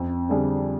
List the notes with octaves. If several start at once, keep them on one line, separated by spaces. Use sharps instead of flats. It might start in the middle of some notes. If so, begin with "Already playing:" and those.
Already playing: F2
D3 G3 D4 G#4